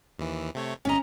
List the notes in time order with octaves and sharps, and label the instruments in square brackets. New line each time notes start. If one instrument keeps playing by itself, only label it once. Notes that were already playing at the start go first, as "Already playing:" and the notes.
[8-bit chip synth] D#2 E3
C3 A3 C#5
[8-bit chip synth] G1 D#5 [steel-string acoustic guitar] C#4 A#5